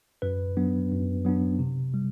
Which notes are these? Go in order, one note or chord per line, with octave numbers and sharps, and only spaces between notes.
F#2 B4
F#3 B3 D4
F#2
F#3 B3 D4
C3
G3